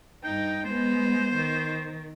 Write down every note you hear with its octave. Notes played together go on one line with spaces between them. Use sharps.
G2 D#4 G5
G#3 B3 C5
D#3